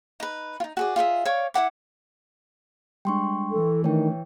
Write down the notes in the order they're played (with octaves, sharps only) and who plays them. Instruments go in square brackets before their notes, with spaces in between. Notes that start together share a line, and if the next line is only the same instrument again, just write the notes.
[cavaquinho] D#4 B4
D#4 F4
F#4 G#4 D5
F4 G#4 D#5 E5
C#5 D5 F5 C#6
E4 C5 F#5 D6
[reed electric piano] G3 G#3 D4 [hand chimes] G5 C6 C#6
[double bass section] E3 [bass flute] A4
[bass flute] D#3 [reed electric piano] A3 D4 [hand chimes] C#5 G5